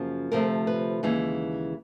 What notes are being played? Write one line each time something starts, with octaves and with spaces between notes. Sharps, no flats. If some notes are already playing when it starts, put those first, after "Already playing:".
Already playing: F#2 C#3 F3 A#3
D2 C3 F3 A3 A#4
B4
D#2 C#3 E3 G#3